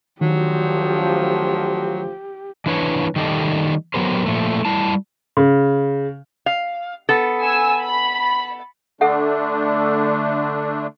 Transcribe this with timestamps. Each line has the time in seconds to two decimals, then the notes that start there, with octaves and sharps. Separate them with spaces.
0.21 D2 D#3 F3 F#3 G4
2.66 E3 D4 B4 C#5
3.16 D#3 G3 A3 G4 A4 D#5
3.94 F#3 B3 G4 A#4 C5
4.26 A#2 F3 A3
4.65 G3 E4 A5
5.37 C#3
6.46 F5
7.09 B3 A4
7.42 G#5 E6
7.84 B5
9.01 D3 A3 D4 A4 E5 F#5